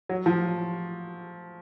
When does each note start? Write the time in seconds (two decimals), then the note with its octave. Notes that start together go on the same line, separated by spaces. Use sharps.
0.09 F#3
0.26 F3